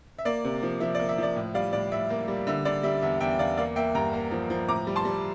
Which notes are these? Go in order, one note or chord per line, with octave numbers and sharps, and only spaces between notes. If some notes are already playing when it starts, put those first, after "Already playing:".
E5
A#3 D5
C3
F3
F3 E5
D5
A#3
E5
F3 D5
A2
G3 D5 F5
A2 D5
A2 E5
A#3
G3
D3 E5
D3 D5
G3 E5
E2 E5
E2 E5 G5
G5
E2 D5 F5
A#3 D5 F5
A#3 E5 G5
G2 G5 A#5
A#3
F3
F3
A2 A#5 D6
G3
A5 C6
G3